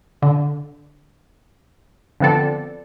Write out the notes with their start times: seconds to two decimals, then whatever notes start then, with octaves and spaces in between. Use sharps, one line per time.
0.22 D3
2.20 D3 F3 B3 C4 A4 D5